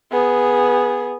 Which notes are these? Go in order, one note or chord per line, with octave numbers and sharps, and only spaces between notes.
B3 G#4